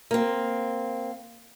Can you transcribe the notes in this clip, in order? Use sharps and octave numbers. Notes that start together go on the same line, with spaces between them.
A#3 C4